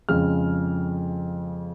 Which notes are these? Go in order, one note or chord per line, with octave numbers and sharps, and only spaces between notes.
F2 C#3 G#3 F6